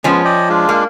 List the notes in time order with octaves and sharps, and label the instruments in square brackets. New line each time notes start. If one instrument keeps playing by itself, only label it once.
[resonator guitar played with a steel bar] F3 C#4 [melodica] G#3 B3
[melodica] D5 D#5 G5
G#3 D4 F4
[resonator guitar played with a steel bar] A#3